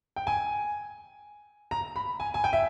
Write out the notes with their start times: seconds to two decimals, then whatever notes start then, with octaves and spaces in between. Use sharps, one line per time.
0.16 G5
0.27 G#5
1.71 A#5
1.96 B5
2.20 G#5
2.34 G#5
2.44 G5
2.53 E5